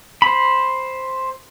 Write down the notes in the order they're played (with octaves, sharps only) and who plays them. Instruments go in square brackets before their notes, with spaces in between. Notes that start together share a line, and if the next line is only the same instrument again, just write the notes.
[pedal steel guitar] C5 B5